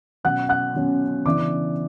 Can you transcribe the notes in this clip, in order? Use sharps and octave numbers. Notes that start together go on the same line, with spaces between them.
B2 F#3 C#4 F#5 F#6
F#5 F#6
B2 F#3 C#4
C#3 E3 B3 D4 D5 D6